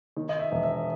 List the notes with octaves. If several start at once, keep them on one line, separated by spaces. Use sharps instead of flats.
D#3
D#5
E5
E1
E5